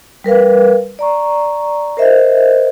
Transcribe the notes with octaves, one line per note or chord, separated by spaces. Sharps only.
G3 A#4 B4 F5
D5 A#5 C#6
A#4 C5 D#5 E5